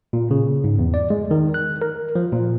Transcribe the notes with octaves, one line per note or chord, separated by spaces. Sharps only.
A#2
C#3
G#2
E2
D5
G#3
D#3
F#6
A#4
F3
A#2